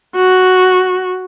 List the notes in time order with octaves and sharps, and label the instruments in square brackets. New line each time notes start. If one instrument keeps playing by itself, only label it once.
[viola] F#4